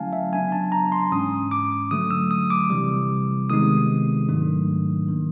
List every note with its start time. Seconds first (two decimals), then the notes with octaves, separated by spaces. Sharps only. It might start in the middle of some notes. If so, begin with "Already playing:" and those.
Already playing: D3 F#3 A3 C#4 E4 F5 G#5 A5
0.13 E5
0.32 C#3 F#3 B3 D4 G#5
0.52 A5
0.72 A#5
0.92 C6
1.11 G#2 E3 G#3 C#4 D#6
1.51 D6
1.91 D3 F#3 A3 D#6
2.11 E6
2.31 D#6
2.50 D6
2.70 C3 E3 G3
3.50 C3 D#3 G#3 B3 D#4 D#6
4.28 G#2 D#3 F#3 A3 D4
5.08 D#3 G3 A#3